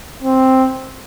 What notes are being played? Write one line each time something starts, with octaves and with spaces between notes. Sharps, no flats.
C4